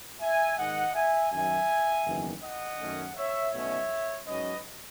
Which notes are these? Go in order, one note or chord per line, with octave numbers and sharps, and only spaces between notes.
E5 G#5
G#2 D#3 G#3 D#5 F#5
E5 G#5
F#2 D#3 F#3 E5 G#5
F#1 E2 D#3 F#3 B3
D#5 F#5
F#2 D#3 A3 C#4
C#5 E5
B1 B2 A3 C#4 C#5 E5
G#2 F#3 C#4 B4 D#5